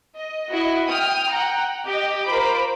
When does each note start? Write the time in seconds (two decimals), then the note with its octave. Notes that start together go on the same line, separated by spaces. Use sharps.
0.16 D#5
0.51 E4 F#4 D#5
0.88 G5 D#6 F6
1.30 F#5 G5 A#5
1.84 G4 D#5
2.26 F4 A#4 C5 B5 D6